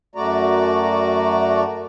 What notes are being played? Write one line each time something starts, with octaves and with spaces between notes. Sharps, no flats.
F#2 A3 F#4 D5 A#5